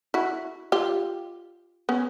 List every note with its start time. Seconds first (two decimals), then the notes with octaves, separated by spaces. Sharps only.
0.14 E4 F#4
0.72 F4 G4
1.89 B3 C#4